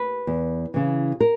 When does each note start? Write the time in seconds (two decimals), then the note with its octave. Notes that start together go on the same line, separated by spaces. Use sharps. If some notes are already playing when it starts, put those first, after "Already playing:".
Already playing: B4
0.27 E2
0.74 C#3 E3
1.20 A#4